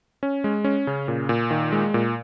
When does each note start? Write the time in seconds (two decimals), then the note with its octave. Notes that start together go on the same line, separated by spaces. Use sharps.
0.23 C#4
0.44 G#3
0.64 C#4
0.87 C#3
1.08 A#2
1.29 A#2
1.51 D#3
1.72 G#3
1.94 A#2